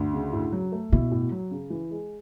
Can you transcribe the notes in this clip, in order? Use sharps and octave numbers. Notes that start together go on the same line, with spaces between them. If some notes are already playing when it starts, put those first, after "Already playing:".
Already playing: D2
C#3
A2
F#3
A3
B2 E4
A2
F#3
C#3
E3
G#3